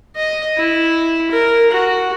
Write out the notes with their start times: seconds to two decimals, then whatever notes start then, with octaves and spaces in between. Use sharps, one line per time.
0.16 D#5
0.56 E4
1.31 A#4
1.71 F#4